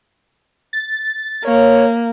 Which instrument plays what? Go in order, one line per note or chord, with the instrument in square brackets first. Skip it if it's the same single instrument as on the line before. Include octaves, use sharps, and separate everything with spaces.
[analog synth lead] A6
[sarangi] A#3 [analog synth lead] C#5